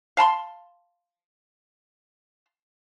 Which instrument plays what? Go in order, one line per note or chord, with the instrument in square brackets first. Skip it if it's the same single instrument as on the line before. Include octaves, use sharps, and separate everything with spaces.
[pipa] F5 A5 B5 C6